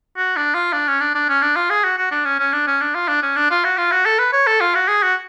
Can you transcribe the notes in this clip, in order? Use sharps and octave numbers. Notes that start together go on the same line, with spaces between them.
F#4
D4
F4
D4
C#4
D4
D4
C#4
D4
F4
G#4
F#4
F#4
D4
C#4
C#4
D4
C#4
D4
F4
D4
C#4
D4
F4
F#4
F4
F#4
A4
B4
C#5
A4
F4
F#4
G#4
F#4